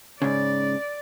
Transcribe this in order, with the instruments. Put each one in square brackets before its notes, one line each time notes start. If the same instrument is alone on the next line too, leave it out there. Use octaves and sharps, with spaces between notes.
[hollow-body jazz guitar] G#2 C#3 [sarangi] D5